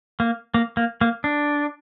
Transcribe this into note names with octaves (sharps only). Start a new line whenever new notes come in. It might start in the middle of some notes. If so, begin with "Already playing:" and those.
A#3
A#3
A#3
A#3
D4